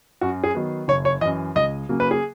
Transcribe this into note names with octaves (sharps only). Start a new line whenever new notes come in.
F#2 F#4
G#4
D#3 F#3 B3
F#1 C#5
C#5
F#2 E3 D#5
C#2 D#5
C#3 F#3 A#3
B4
G#4